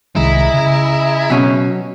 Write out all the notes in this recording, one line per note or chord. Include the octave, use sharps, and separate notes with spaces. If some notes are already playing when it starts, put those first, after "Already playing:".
C2 D#3 G#3 E4 G#4 D#5 A#5
C#3
B2 F#3 C#4